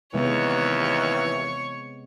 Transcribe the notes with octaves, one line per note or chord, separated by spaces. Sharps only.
D#2 C3 E3 G#3 B3 C#5